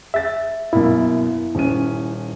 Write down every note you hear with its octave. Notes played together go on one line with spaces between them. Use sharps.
G#4 E5 A6
F#2 B2 A#3 E4
D#1 C#4 D#7